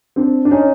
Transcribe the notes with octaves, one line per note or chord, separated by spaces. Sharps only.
C4 D4
D4
C#4 D#4